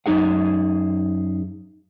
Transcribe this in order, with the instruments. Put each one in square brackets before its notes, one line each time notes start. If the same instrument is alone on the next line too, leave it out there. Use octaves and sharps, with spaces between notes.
[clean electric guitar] F#2 D#4 G#4 F#5